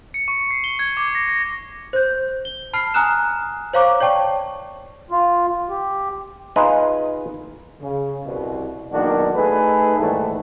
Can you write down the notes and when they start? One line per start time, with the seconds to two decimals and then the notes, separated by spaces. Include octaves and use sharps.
0.14 C#7
0.28 C#6
0.51 C7
0.64 G7
0.79 G#6
0.97 D6
1.15 A#6
1.29 A#6
1.93 C5 G6
2.45 G7
2.73 A5 B5 F6 C7
2.94 G#5 A#5 D#6 F6 F#6 E7
3.73 C5 C#5 F5 A#5 C#6 D6
4.00 C#5 D5 G5 A5 C#6
5.11 F4
5.69 G4
6.56 D#4 F4 G#4 B4 D#5
7.81 C#3
8.24 C2 B2
8.92 B1 E2 D#3 A#3 D4 F#4
9.35 A3 D#4 G#4 A4 B4
9.98 D#2 G#2 E3 G3 A3